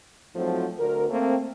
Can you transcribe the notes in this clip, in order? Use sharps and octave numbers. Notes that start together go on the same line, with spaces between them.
G#2 F3 F#3 A3 C4
D2 A#4
A3 A#3 C4